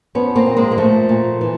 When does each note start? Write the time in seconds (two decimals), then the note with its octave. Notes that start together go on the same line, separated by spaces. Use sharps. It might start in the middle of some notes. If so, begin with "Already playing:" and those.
0.15 F3 B3 C#4
0.36 A#3 C4
0.46 A#2
0.57 G#3 A#3
0.71 A#3
0.78 F3 A3
1.09 A#2
1.41 E3